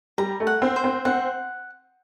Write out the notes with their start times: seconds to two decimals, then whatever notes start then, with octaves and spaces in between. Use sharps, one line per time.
0.18 G3 A#5
0.40 A3
0.47 F#5
0.62 C4
0.76 C5
0.84 C4
1.05 C4 F#5